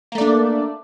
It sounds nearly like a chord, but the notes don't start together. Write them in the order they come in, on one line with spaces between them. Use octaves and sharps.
A#3 A3 D5 D4